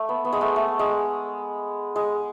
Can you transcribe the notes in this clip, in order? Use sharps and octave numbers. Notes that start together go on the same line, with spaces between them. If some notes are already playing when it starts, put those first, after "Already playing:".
Already playing: A3
B3
B3
G#3
A3
A3
G#3
G#3